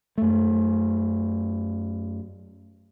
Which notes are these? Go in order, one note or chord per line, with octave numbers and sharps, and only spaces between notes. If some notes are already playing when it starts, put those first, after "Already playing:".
F#2 A3